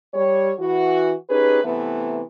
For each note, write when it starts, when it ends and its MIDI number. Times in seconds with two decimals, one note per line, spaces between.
0.14 0.52 55
0.14 0.52 73
0.59 1.13 52
0.59 1.13 66
1.29 1.63 61
1.29 1.63 63
1.29 1.63 67
1.29 1.63 68
1.29 1.63 71
1.64 2.21 48
1.64 2.21 52
1.64 2.21 57
1.64 2.21 59